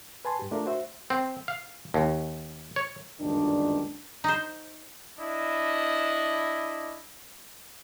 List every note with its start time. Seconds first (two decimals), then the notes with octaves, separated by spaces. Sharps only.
0.25 B4 G#5 A5 C6
0.39 G2 G4
0.51 A3 D4 F4 A#4
0.66 F#4 C5 E5
1.10 C4
1.48 F5
1.94 D#2
2.76 C#5
3.20 G1 C#2 F#2 A#2 D#3 D4
4.24 D#4 C5
5.19 D4 E4 D#5